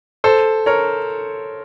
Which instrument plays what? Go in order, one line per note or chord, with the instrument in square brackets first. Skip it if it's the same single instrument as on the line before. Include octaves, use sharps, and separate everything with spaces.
[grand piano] A4 C5
A#4 C#5